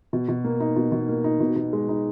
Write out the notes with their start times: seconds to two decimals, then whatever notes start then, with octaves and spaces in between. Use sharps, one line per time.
0.13 B2
0.28 B2
0.44 A#3
0.60 D#4
0.76 B2
0.92 B2
1.09 A#3
1.24 D#4
1.40 B2
1.56 B2
1.73 G#3
1.89 D#4